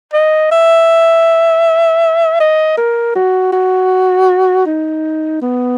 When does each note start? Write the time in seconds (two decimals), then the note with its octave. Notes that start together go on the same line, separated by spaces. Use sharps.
0.13 D#5
0.51 E5
2.40 D#5
2.77 A#4
3.15 F#4
3.52 F#4
4.66 D#4
5.42 B3